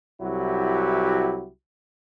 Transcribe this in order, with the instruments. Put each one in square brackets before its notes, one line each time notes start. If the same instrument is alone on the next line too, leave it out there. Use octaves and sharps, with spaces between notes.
[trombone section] C2 F#3 E4 F#4 G4